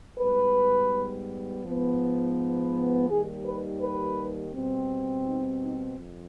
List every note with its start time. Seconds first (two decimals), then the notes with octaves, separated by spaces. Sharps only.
0.19 G#2 G3 B3 B4
1.64 G#2 F3 B3
3.08 D#2 D#3 G3 G#4
3.45 B4
3.81 B4
4.53 B2 G3 C4
5.26 D#4
5.62 D#4
5.98 F2